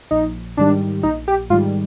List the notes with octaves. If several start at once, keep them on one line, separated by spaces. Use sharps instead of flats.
A#1 D#4
G#2 D#3 G3 D4
A#1 D#4
G4
G#2 D#3 G3 F4